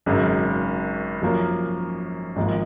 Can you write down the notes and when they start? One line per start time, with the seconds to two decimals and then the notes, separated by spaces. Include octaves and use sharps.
0.06 G#1 F#2 C#3
1.22 F#2 F3 A#3 C#4
2.36 G#1 G#2 F3 A#3